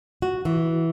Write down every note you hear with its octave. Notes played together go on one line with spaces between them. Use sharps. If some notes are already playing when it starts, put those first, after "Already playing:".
F#4
E3